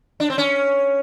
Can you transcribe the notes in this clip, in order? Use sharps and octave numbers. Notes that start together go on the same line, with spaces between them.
D4
C4
C#4